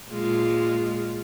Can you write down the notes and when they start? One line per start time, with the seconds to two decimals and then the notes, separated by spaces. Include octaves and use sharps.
0.11 A#2 G#3 F4